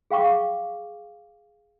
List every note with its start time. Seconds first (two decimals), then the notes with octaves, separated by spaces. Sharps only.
0.11 G#4 F5 G5 C#6 D6